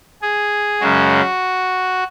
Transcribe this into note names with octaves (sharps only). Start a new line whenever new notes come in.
G#4
F#2 C#3 G#3 F#4